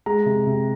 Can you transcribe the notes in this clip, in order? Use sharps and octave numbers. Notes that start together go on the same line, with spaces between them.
G#3 A#5
C3
C3